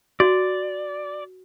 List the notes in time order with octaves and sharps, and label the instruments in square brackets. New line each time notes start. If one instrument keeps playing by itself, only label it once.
[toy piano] F#4 [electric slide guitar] D5